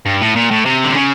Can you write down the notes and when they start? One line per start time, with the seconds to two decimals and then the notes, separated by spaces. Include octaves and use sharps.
0.06 G2
0.21 A2
0.35 A#2
0.51 A2
0.65 C3
0.84 D3
0.95 C#3